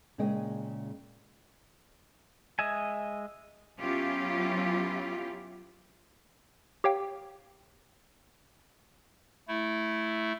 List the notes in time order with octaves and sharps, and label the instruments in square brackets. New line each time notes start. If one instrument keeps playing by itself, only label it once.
[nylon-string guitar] A#2 C#3 G#3 G#4 D#5 G5
[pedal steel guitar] G#3 D#5 E5 G#5
[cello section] F#3 B3 C#4 E4 F4 G4
[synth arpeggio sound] G4 C#5 F5 G5
[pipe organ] A3 E4